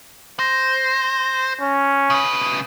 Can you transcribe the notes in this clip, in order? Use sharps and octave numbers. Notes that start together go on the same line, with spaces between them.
C5 A#6
C#4
C#3 B4 D#6